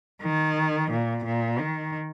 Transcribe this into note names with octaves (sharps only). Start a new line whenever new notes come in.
D#3
A#2
A#2
D#3